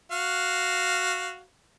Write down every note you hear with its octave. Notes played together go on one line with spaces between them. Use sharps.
F#4 F5